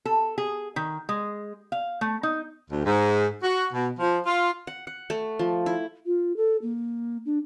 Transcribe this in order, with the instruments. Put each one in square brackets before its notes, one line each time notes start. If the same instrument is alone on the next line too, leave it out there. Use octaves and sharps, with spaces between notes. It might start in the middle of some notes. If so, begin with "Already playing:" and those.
[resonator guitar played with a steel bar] A4
G#4
D#3
G#3
F5
A3
D#4
[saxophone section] D2
G#2
F#4
B2
F3
F4
[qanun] F#5
F#5
A3
F3
E4
[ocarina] F4
A4
A#3
D4